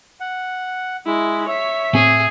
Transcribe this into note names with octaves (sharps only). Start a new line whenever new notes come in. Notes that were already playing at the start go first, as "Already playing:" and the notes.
F#5
G#3 E4
C#5 E5 B6
A2 C4 G#4